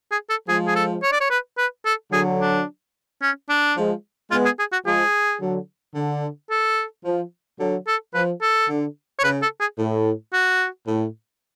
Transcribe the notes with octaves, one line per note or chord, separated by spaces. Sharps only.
G#4
A4
F3 G#3 G#4
G#4
A4
C#5
D5
C#5
B4
B4
A4
D3 F#3 G#4
D4
C#4
D4
F3 G#3
G#3 B3 F4
G#4
G#4
F#4
F3 G#3 G#4
D3 F#3
D3
A4
F3
D3 F#3
A4
F3 B4
A4
D3
C#5
C#3 B4
A4
G#4
A2
F#4
A2